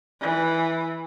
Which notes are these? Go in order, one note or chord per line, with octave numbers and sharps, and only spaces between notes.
E3